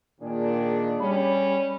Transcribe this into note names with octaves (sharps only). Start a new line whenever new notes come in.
A#2 D#3 D4 G#4
G3 C#4 B5